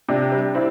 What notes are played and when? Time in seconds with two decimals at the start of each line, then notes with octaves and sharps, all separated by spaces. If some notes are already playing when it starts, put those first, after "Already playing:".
0.09 C3 D4
0.32 G3
0.55 C4 E4